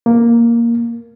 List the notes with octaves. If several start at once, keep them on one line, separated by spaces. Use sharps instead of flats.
A#3